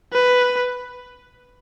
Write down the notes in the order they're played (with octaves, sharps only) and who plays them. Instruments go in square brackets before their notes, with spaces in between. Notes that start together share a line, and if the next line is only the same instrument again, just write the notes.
[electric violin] B4